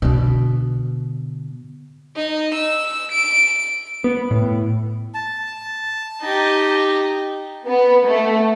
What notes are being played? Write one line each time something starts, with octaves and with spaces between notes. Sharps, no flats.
B2 D3
D#4
E6
D7
B3
A2
A5
D#4 G4
B3
A3